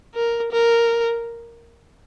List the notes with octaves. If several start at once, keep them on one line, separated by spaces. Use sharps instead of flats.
A#4
A#4